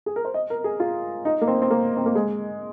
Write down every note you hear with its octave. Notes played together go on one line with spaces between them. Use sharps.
G#4
A#4
C5
D#5
A#4
G#4
F4
D#4
A#3
C4
C4
A#3
C4
A#3
G#3